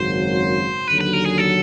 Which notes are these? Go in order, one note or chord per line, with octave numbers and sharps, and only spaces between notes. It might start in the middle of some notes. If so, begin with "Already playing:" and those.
Already playing: G#1 F#2 C#3 F#3 C5
D#2 D3 F#3 B4
B4
A#4
G#4
A4